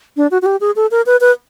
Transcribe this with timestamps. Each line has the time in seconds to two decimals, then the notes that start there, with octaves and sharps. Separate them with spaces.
0.17 D4
0.31 F#4
0.42 F#4
0.46 G4
0.61 G#4
0.76 A4
0.91 A#4
1.06 B4
1.21 B4